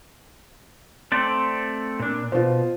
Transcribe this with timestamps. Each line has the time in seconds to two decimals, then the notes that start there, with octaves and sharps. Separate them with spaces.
1.12 A3 C4 D5
2.00 A#2 D4
2.32 B2 F4 C5